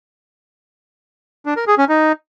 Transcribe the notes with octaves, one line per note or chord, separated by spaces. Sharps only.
D4
A#4
G#4
C#4
D#4